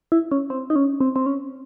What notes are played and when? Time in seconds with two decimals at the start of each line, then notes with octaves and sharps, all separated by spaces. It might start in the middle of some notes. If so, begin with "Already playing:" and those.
0.12 E4
0.31 C#4
0.50 C4
0.70 D#4
0.76 C#4
1.01 C4
1.16 C4
1.26 C#4